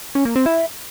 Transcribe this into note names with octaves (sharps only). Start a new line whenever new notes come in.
C#4
A#3
C4
E4